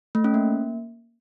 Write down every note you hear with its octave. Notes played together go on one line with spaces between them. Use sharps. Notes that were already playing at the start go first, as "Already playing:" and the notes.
A3
C#4
A#3